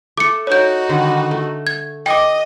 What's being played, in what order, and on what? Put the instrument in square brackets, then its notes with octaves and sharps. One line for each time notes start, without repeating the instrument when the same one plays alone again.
[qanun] A3 A4 [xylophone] D6 C#7
[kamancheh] D#4 F#4 [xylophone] C#5 G6
[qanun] D3 D#3 G3
A3
[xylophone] G#6
[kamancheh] D#5 [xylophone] G5 D6